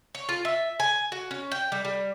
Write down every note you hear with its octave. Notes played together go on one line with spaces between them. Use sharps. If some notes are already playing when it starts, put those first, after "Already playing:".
C#5
F4
E5
G#5
F#4
C#4
G5
G3
G3